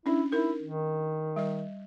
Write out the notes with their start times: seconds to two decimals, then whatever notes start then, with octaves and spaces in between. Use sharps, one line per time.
0.06 C#4 D4 E4
0.32 D#4 E4 A#4
0.62 D#3
1.36 G3 D#5